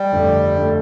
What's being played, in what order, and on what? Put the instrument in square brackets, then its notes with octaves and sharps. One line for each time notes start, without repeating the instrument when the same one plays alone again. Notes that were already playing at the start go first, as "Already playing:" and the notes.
Already playing: [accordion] G3
[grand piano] G1 F2 D3 A3
D3 A3